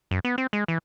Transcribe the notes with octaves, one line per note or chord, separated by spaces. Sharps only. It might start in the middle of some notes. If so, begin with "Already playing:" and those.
F#2
B3
C4
G#3
E3